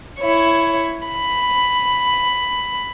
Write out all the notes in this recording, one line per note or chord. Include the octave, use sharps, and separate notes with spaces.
E4 C#5
B5